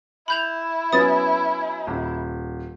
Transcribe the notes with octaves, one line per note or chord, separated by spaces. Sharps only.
E4 B5 G6 F7
F#3 B3 C#4 D#6 A6
D#1